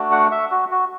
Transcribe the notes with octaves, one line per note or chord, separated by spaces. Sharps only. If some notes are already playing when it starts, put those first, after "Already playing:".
Already playing: A3 D4 F#4
F#5
E5
F#4
F#4